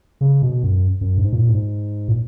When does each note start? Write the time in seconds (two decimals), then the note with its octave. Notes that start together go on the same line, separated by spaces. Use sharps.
0.21 C#3
0.42 B2
0.63 F#2
1.01 F#2
1.18 G#2
1.33 A#2
1.49 G#2
2.08 A#2